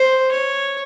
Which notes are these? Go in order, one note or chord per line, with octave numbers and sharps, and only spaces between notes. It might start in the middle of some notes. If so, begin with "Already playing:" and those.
Already playing: C5
C#5